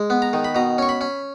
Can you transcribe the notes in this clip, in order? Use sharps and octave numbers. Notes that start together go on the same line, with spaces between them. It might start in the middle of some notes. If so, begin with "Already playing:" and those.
Already playing: G#3
B3
A#5
D#3
B5
B2 A#5
C#4 C#6
B5
C#4